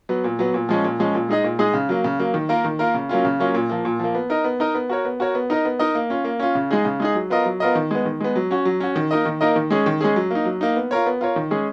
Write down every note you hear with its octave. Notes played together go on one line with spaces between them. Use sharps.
F#3 B3
A#2
F#3 B3
A#2
F3 G#3 C#4
A#2
F3 G#3 C#4
A#2
G#3 D#4 G#4 D#5
A#2
G#3 D#4 G#4 D#5
C#3
F#3 A#3
C#3
F#3 A#3
D#3
A#3 F4 A#4
D#3
A#3 F4 A#4
C#3
F#3 A#3 C#4 F4
C#3
F#3 A#3 C#4 F4
A#2
F3 A#3
A#2
F3 A#3
B3
D#4 A#4 D#5
B3
D#4 A#4 D#5
B3
F#4 A#4 C#5
B3
F#4 A#4 C#5
B3
D#4 A#4 D#5
B3
D#4 A#4 D#5
A#3
C#4 F4
A#3
C#4 F4
C#3
G#3 D#4 G#4
C#3
G#3 D#4 G#4
F#3
B3 F4 A#4 D#5
F#3
B3 F4 A#4 D#5
D#3
G#3 B3
D#3
G#3 B3
F#3
C#4 F#4
F#3
C#4 F#4
D#3
A#3 D#4 A#4 D#5
D#3
A#3 D#4 A#4 D#5
D#3
G#3 C#4 G#4
D#3
G#3 C#4 G#4
F#3
A#3 D#4
F#3
A#3 D#4
B3
F4 A#4 C#5
B3
F4 A#4 C#5
D#3
G#3 C#4 G#4